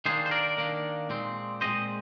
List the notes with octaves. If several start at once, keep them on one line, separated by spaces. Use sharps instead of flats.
D#3 A#3 D4 G#4 C5
C5
A#4 D5
D#3 A#3 D4
A#2 G#3 C4
A#2 G#3 C4 C5 D#5